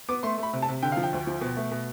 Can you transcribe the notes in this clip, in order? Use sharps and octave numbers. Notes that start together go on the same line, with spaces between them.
B3 D6
A3 C6
A3 B5
C3
A5
C3
D3 G5
F3 F5
G5
D2
F3
B2
A3
B2